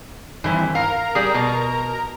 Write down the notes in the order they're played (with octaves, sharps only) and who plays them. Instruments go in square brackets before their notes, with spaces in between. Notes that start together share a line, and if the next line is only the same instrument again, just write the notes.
[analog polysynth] G2 D#3 C4 [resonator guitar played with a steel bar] E3 E4
[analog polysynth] A#4 A#5 [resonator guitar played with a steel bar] F5
[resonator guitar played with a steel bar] G3 G#4
B2